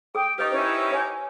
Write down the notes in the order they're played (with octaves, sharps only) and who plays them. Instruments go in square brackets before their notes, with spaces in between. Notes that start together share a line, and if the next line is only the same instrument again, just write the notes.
[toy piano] G#4 D#6 [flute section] G5
[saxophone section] D#4 G4 [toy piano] B4 D#5 C#6 [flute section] D#6
[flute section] C#4 E4 [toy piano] C5
[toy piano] C#5 G#5